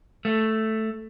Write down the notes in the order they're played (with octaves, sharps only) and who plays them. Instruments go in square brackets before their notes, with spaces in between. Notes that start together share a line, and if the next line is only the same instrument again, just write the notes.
[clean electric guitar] A3